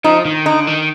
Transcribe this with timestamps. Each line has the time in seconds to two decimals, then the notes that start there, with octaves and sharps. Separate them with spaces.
0.04 F3 D#4
0.25 D#3
0.45 D3 D#4
0.67 D#3